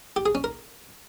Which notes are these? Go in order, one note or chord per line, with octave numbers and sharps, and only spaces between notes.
G4
G#4
C#4
A#4